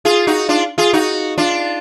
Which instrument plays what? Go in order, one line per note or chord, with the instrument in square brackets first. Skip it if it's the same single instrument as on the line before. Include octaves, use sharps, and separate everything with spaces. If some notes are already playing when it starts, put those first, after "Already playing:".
[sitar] F4 G#4
D#4 F#4
D4 F4
F4 G#4
D#4 F#4
D4 F4